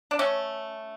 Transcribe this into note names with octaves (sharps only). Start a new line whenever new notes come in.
D4
A3 C#4